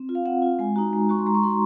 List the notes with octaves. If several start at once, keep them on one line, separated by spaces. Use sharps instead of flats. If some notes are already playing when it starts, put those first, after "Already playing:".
Already playing: C4
F4
F5
C4 F#5
F4
G#3 G#5
D#4 F#4 A#5
G#3
D#4 F#4 C#6
C6
G#3 A#5
C#6
D#4 F#4 C6
A#5